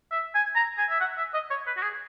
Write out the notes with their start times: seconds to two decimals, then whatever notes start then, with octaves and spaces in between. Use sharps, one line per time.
0.12 E5
0.35 G#5
0.56 A#5
0.78 G#5
0.90 E5
1.00 F#5
1.18 E5
1.34 D#5
1.50 C#5
1.67 B4
1.77 F#4
1.82 G#4